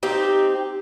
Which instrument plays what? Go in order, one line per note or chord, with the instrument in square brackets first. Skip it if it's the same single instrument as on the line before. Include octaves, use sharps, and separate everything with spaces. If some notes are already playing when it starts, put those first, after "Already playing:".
[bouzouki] C4 D#4 G4